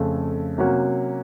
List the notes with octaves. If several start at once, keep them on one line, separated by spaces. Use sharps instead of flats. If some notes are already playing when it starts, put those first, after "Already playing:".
Already playing: F2 C#3 A3
C3 F#3 A#3 C#4 F#4